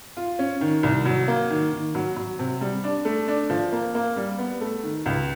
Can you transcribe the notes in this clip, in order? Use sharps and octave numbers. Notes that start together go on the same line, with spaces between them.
F4
C#4
D#3
C2
F#3
A#3
D#3
D#3
F#3
F#3
C3
G3
D4
A3
D4
F3
A#3
A#3
G3
B3
A3
D#3
C#2